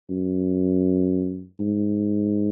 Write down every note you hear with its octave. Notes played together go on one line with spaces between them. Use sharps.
F#2
G#2